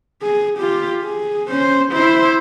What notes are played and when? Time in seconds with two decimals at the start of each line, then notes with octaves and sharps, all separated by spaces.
0.22 G#4
0.59 F4 G4
1.03 G#4
1.50 C#4 C5
1.92 E4 C5